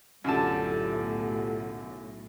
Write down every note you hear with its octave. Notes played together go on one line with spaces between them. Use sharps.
B1 F#2 A2 D3 F4 G4 A4 A5